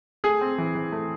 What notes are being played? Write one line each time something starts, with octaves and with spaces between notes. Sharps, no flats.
A3 G#4
C4
E3
E3
A3